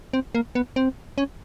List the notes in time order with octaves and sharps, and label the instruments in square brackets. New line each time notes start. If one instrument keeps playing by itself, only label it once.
[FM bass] C4
A#3
B3
C4
C#4